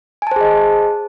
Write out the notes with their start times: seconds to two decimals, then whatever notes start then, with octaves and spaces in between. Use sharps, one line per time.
0.22 G#5
0.27 A5
0.31 C5
0.36 G#4
0.41 D#5